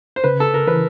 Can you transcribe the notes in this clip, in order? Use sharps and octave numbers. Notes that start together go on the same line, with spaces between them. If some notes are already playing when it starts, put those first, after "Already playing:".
C5
C#3 B4
A4
A#4
E3 B4